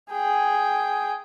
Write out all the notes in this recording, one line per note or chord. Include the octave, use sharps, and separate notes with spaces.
G#4 G5